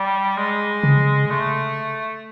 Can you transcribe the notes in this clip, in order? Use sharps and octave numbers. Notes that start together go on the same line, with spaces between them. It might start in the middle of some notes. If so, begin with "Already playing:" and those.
Already playing: G3
G#3
C#3
A3